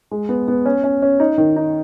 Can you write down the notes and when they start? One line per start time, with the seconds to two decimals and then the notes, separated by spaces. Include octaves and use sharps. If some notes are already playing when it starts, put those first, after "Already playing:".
0.11 G#3
0.29 B3
0.48 B3
0.65 C#4
0.84 C#4
1.02 C#4
1.20 D#4
1.38 D#3
1.56 D#4